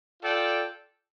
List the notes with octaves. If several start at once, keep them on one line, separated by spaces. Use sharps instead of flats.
F4 A4 D5 G5